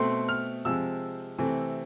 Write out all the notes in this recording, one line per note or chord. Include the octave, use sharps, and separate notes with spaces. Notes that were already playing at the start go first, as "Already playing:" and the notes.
Already playing: B2 A3 C4 C6
F6
C3 F3 G#3 C4 E6
C3 E3 A3 C4